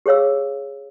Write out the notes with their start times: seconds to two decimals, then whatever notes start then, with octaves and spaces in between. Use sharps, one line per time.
0.06 G4 G#4 C#5 F5 E6